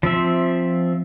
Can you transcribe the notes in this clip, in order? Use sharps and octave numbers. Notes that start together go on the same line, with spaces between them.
F3 C4 E5